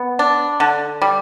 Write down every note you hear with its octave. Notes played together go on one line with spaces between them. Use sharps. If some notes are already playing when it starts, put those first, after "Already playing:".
Already playing: B3
D4
D3
G3